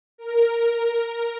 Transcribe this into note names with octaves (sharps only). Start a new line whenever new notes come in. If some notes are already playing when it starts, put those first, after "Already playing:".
A#4